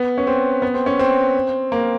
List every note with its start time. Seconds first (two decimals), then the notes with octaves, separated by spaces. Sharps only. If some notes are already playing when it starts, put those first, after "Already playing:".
Already playing: B3
0.18 C#4
0.27 C4
0.62 B3
0.74 C4
0.86 C#4
0.99 C4
1.72 A#3